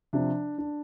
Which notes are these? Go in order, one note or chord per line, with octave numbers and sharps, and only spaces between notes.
C3 F3 D4
D4